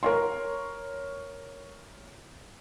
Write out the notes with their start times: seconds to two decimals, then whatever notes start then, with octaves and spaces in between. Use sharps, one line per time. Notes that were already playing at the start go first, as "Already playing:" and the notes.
0.03 A#4 C#5 C6